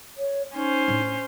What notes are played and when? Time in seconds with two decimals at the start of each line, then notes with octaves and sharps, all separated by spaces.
0.17 C#5
0.55 C#4 D#4 C5
0.88 A2 D4